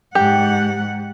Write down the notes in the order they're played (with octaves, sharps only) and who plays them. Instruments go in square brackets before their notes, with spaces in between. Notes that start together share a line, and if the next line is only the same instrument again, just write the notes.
[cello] G#2 F#5 [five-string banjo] G4